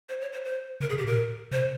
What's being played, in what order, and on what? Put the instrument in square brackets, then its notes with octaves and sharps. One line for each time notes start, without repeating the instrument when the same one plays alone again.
[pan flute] C5
C#5
C5
C5
[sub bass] C#3 [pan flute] A#4
[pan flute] G#4
[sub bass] C3
[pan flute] G4
[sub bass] A#2 [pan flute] A#4
[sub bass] C3 [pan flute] C5